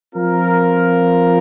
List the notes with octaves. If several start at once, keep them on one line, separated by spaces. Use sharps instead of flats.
F3 C4 F4 A#4